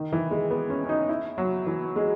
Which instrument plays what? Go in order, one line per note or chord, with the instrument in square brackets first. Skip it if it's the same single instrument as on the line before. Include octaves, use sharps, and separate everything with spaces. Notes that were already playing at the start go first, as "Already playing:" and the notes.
Already playing: [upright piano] D#3
E3
G#3
B3
C#4
C#4
D#4
E4
F#3
E3
G#3